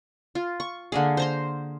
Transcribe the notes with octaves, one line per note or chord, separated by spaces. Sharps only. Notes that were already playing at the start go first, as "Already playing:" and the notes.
F4
C#6
D3 A#3 G#4
C5 A#5 C6